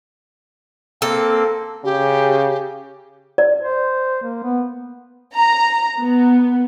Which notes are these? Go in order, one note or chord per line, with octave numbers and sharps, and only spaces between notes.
A#3 C4 A4
C#3 G4
D5
C5
A#3
B3
A#5
B3